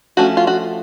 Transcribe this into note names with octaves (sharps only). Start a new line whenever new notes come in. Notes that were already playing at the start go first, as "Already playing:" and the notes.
F3 A3 C#4 F#4
F4
F#4